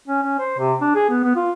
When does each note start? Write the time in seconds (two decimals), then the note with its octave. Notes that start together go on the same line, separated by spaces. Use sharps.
0.08 C#4
0.22 C#4
0.38 C5
0.58 C3
0.81 D4
0.95 G#4
1.09 B3
1.24 B3
1.35 F4